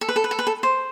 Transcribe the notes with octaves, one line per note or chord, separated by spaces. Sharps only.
A4
B4
A4
B4
A4
B4
A4
C5